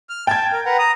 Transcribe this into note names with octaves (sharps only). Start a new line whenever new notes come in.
F6
G5 A5 G#6
A#4
B4 F#5 A#5
A#5 D#6